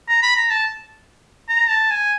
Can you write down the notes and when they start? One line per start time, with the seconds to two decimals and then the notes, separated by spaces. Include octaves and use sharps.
0.09 A#5
0.22 B5
0.36 A#5
0.50 A5
1.49 A#5
1.70 A5
1.91 G#5